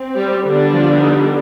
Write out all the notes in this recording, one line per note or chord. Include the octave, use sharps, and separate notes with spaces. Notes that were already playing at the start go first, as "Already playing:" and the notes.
Already playing: C4
G3 G4
D3 G3 B3 D4
F3 F4
D#4